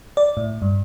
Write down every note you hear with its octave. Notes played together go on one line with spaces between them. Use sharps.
D5
A2
G2